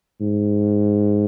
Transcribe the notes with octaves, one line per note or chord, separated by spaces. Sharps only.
G#2